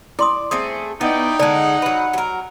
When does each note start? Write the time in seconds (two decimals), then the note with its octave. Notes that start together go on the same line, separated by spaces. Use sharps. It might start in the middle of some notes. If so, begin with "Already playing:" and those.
0.19 E4 D5 C6 D#6
0.51 A3 C4 G#4 D#6
1.01 B3 D#4 E4 D5 G5
1.39 D3 G#3 D5 F#5 A5
1.82 F#3 B4
2.13 F#3 A#4